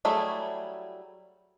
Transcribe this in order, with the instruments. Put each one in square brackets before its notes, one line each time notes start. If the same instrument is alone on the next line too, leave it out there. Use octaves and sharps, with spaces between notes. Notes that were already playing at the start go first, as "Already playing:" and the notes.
[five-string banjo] F#3 G3 A3 E4 G#4